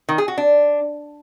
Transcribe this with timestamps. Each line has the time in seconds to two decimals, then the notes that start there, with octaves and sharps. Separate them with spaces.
0.09 D#3
0.18 G#4
0.28 F#4
0.38 D4